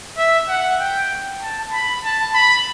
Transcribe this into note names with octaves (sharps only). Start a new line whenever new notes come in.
E5
F#5
G5
A5
B5
A5
B5